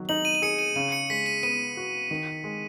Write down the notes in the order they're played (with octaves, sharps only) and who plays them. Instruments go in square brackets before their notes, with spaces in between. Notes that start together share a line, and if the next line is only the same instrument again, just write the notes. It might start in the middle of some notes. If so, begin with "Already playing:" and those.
Already playing: [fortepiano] D#3 F#3
[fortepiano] D#4 [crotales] F#7
[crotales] D#7
D#7
[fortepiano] G#4 [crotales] C#7
[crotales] D#7
[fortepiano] C#3 [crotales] D#7
[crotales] C#7
[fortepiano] G#3 [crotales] B6
[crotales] D#7
[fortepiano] B3 [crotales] D#7
[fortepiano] F#4
D#3
G#3